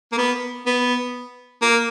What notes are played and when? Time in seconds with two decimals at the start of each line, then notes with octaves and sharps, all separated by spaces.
0.12 A#3
0.18 B3
0.66 B3
1.62 A#3